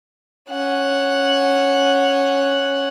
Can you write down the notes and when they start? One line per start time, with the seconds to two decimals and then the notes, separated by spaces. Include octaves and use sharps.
0.50 C#4 F#5